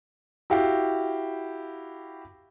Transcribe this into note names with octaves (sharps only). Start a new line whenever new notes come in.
E4 F#4 G4 F5